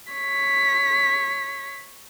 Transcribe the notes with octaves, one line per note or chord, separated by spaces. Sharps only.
C#5 B6